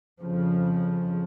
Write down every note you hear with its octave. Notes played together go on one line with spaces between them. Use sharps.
F2 C#3 F3